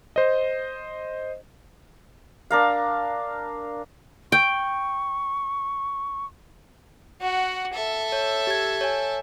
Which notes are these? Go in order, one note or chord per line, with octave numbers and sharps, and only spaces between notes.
C5 D#5
D4 A#4 F5
G5 C#6
F#4 F#5
A4 E5
C#5
G4 G#6
C#5 G#5